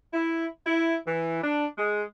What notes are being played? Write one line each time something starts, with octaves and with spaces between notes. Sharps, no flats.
E4
E4
E3
D4
G#3